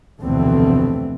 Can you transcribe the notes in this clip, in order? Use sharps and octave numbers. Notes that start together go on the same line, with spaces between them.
F1 D2 B2 E3 A3 C4